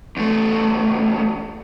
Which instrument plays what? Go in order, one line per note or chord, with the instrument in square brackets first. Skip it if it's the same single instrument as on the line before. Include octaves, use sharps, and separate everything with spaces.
[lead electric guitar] E2 A3